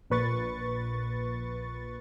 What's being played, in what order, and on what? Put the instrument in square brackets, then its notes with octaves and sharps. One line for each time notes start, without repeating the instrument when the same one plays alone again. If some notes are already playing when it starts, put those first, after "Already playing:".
[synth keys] A#1 A#2 B4 C#6 A6